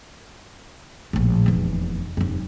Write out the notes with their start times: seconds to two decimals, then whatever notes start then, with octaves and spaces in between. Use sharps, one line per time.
1.13 A#1 A2
1.46 F1 E2
2.17 F1 F#2